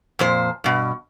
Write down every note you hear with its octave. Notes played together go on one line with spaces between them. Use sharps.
F2 A#2 C5
G2 B2